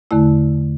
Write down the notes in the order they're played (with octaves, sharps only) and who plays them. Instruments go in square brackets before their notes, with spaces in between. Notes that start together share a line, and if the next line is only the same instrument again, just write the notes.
[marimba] E2 D3 A3 E4